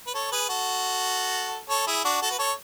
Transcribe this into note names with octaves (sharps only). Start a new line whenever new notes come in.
B4
A4 C#5
G#4 B4
F#4 A4
A4 C#5
E4 G#4
D4 F#4
F#4 A4
B4
A4 C#5